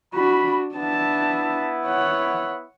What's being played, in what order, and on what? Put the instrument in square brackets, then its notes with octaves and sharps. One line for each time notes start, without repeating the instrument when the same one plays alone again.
[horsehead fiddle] D4 F#4 [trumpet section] B5
[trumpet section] B3 E4 [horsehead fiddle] D4 A5
[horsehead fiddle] C#5 F#5